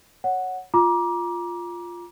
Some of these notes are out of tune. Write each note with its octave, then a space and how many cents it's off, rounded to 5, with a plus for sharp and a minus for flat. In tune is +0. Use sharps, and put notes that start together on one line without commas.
C#5 +0 F#5 +0
F4 +0 A#5 +30 D6 +0